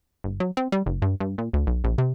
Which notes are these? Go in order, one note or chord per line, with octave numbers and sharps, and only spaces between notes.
G1
F#3
C4
G3
F#1
G2
G2
A#2
D2
B1
A#1
C3